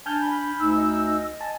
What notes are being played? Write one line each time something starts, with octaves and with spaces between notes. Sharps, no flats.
D4 G#5 A5 F6 G6
B5
D2 D#4 E6
D#5
G#5 A5